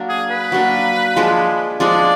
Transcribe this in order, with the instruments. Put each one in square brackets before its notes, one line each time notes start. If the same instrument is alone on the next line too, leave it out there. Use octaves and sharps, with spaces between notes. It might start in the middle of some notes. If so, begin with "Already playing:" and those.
Already playing: [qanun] F#3 A#3 D4
[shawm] G#4
B4
[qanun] F#3 A#3 D4
F3 G#3 D4 G#4
[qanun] F3 G#3 D4 G#4 [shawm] D5